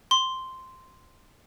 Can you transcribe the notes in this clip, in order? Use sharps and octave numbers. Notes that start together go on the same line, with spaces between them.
C6